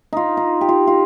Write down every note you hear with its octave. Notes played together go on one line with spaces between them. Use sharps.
D#4 F4
D#4
G4
F4
F4